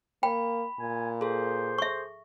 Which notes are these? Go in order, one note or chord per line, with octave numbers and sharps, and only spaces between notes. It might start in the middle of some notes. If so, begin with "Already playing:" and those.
A#3 G5 B5
A#2 G#5
G#4 A4 C5
E5 C#6